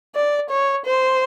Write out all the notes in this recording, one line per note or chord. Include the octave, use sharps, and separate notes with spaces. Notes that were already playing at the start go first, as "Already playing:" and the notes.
D5
C#5
C5